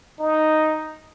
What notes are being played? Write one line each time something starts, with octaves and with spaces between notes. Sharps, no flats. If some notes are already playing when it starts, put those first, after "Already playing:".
D#4